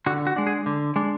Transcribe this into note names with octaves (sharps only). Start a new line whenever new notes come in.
D3 F#4
F#4
G#3 D4
G#4
D3
G#3 D4